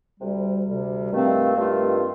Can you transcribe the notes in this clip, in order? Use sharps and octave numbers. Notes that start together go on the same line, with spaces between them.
D2 C3 G3
D2 C3 G3
G2 D#3 A3 C4 F4
G2 D#3 A3 C4 F4